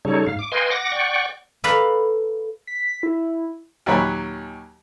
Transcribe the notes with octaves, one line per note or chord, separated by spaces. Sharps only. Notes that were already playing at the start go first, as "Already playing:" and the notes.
C#3 G3 D#4 A4 C#5
G#2 F5
D6
B4 D#5 F5 G5 G#5 C6
F#5 D6 A#6
D5 F#5 G5 C#6
A4 B4 D5 F5 A#5 B5
B6
E4
D#2 A#2 F#3 C#5 B5